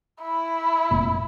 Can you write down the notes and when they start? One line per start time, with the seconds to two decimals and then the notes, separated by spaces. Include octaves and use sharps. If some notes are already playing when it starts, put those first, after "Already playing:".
0.23 E4
0.91 F1 A#2